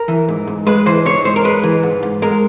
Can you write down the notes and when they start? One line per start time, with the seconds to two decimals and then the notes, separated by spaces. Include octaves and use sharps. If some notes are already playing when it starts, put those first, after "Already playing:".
Already playing: A#4
0.08 E3
0.28 G#2
0.47 G#2
0.67 G#3 B4
0.86 E3 C5
1.06 G#2 C#5
1.25 G#2 C5
1.36 A#4
1.44 G#3 B4
1.63 E3
1.83 G#2
2.03 G#2
2.22 G#3 A#4